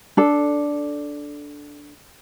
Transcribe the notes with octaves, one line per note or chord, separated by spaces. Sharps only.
D4 A4